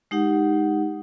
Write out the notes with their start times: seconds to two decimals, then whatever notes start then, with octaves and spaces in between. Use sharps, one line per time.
0.11 G#3 D#4 G4 F#5